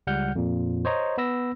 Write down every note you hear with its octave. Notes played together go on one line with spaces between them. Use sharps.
C#2 G3 F#5 F6 G6
F2 A#2
C5 C#5 D#5 A#5
B3 B5 E6 A#6